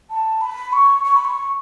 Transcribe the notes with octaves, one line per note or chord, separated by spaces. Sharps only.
A5
B5
C#6
C#6
B5
C#6